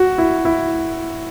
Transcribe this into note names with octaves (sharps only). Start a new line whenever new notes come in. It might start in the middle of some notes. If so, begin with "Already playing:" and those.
Already playing: F#4
E4
E4